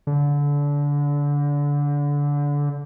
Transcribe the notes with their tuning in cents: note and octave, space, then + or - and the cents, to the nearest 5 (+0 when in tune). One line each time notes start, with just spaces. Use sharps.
D3 -25